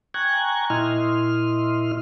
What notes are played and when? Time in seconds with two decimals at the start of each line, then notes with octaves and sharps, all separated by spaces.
0.14 G5 G#5 A#5 C#6 F#6 G#6
0.70 A#2 E4 D#5 C6 F6